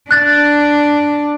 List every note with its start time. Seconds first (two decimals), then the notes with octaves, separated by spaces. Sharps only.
0.11 D4 F#6 A6